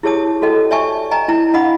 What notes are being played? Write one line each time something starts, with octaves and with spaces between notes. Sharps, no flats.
E4 G4 G#4 C#5 A5 D#6
F#4 A4 D#5 G5
C#5 D5 E5 G#5 A5 C#6
D#5 G5 G#5 A#5
E4 G5 A#5
D4 D#5 F5 F#5 B5 D#6